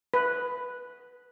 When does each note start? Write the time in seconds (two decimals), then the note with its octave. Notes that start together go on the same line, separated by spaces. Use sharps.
0.14 B4